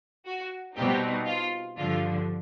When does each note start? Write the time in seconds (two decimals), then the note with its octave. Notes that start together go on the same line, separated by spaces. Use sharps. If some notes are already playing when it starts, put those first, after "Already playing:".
0.26 F#4
0.76 B2 G3 C4 D#4 G4
1.27 F4
1.77 G2 D3 F3 F4